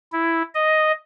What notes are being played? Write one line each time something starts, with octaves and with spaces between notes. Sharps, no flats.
E4
D#5